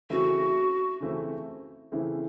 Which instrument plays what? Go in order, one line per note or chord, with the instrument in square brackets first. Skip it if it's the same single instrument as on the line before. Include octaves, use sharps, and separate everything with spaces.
[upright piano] C#3 E3 A3 C4 E4 [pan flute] F#4
[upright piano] C#3 E3 A3 C4 E4
C#3 E3 A3 C4 E4